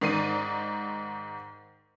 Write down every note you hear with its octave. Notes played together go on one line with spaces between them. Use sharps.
G#2 D#3 D5 C7 D#7